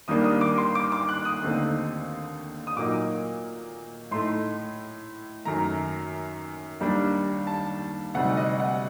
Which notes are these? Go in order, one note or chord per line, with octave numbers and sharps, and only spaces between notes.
D#2 D#3 G3 A#3 D4 D#6
D#6
D6
C6
D6
D6
F#6
D#6
D#2 D3 A3 C4 D#4
D#6
A#2 F#3 A#3 D#4 D6
A2 A3 D#4 C6
F#2 D#3 A3 A#5
D#2 D#3 G3 D4
A5
D2 C3 G3 C4 D#4 F#5
D#5
F#5